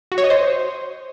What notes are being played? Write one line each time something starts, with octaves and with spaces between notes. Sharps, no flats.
F#4
C#5
D#5
C5